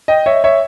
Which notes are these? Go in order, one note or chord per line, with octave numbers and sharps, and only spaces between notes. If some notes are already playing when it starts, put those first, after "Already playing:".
D#5 G5
C#5 E5
C#5 E5